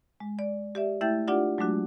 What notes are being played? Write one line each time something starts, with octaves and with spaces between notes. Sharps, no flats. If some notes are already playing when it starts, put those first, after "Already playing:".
G#3
D5
G4 D5 E5
A3 E4 E5 G5 G6 A6
D4 F4 G4 D5 F#5
F#3 G#3 A3 D4 F#4